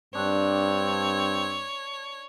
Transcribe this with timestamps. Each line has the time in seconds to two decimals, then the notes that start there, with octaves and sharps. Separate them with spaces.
0.15 G2 C4 D4 C#5